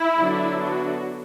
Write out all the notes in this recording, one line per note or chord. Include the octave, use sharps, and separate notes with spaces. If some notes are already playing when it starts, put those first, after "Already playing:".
Already playing: E4
D3 F#3 B3 D4
F#4